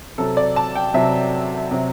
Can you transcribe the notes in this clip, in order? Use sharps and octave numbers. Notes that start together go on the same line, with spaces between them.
C3 F#3 A4
D5
A5
G5
C3 F#3 E5
C3 F#3